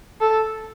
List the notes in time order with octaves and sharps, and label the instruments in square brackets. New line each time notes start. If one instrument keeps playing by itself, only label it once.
[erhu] A4